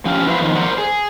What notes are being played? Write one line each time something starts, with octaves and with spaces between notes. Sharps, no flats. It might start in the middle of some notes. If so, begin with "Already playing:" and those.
F3 C#4 G4 F5
E4 F#4 B4 C5 D5 F5
F2 D#3 F3
A#4 C5 D5 F#5
G#4